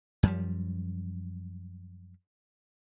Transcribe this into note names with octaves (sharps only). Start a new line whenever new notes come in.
F#2 F3 G3